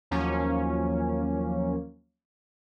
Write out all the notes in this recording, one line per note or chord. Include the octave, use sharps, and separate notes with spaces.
D#2 F3 F#3 A#3 C#4